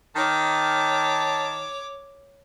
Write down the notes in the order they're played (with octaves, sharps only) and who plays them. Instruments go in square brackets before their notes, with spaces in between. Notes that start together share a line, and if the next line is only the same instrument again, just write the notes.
[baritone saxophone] D#3 [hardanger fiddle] C#5 D6 [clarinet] A5